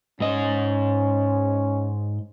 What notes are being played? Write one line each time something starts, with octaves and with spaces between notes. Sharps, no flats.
G#2 C#4 D#5